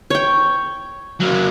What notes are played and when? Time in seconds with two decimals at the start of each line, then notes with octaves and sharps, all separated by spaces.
0.10 C#5 G5
1.20 F#3 A#3